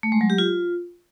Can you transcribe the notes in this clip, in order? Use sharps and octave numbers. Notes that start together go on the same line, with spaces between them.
A3
G#3
F#3
G4
F4